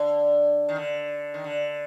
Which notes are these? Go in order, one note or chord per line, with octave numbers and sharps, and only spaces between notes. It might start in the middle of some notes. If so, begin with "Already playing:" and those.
Already playing: D3
D#3
D3
D#3
D3